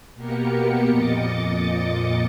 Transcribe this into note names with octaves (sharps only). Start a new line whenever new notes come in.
B2 A#3 B3 G4 A#4 C#7
F2 A#2 D#5 D6 A6 C#7